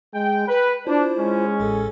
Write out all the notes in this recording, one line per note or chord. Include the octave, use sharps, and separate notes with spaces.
G#3 G5
B4
D4 E4 F4 C5
G#3 C#4
A1 A2 A4